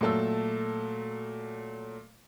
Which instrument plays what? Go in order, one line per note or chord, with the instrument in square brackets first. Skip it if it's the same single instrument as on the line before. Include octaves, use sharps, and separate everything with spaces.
[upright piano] A#2 F#3 A3 A5 E6